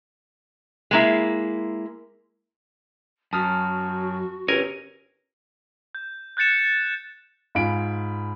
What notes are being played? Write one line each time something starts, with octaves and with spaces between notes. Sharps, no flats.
G#3 A#3 E4
F#2 F#4 A5 D#6 F6
G1 C#4 A#4 G#5
G6
F#6 G6 A6 C#7 E7
G#2 F4 G#5 B5 D7